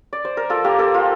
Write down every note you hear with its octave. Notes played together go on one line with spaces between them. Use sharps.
D5
C5
A#4
F4 A4
A#3 G4
A#3 A4
F4